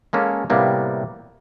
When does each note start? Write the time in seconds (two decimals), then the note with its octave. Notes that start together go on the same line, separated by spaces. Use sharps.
0.13 G#3 A#3 C#4 A4
0.50 A2 C3 G3 A#3 B3